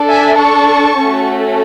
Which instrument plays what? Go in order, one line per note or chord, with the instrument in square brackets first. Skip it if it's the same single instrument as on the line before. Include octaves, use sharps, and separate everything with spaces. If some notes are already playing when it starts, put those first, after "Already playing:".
Already playing: [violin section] D4 A4
E5 G#5
A5 C#6
A3 C#4 F#4 A4